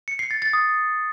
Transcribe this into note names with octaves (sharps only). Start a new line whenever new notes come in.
C#7
C7
A6
A6
D#6